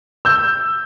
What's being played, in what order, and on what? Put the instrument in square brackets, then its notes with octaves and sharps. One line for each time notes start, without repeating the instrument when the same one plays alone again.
[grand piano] E6 G6